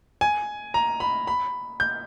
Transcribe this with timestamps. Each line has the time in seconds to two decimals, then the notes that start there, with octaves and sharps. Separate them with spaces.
0.21 G#5
0.74 A#5
1.00 B5
1.27 B5
1.80 G6